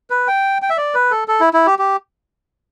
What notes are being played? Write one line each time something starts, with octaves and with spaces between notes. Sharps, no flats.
B4
G5
G5
E5
D5
B4
A4
A4
E4
E4
G4
G4